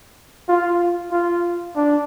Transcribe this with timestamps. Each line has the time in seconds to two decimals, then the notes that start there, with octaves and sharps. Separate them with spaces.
0.49 F4
1.11 F4
1.76 D4